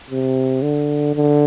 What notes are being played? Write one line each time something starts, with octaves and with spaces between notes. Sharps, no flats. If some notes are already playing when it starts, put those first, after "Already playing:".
C3
D3
D3